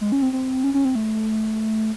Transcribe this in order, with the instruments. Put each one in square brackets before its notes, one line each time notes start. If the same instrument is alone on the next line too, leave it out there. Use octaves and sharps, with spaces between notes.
[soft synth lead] G#3
C#4
C4
C4
C#4
C#4
C4
A3